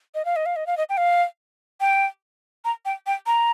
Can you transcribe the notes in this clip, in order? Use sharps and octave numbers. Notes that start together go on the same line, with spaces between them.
D#5
F5
D#5
F5
D#5
F5
D#5
G5
F5
G5
A#5
G5
G5
A#5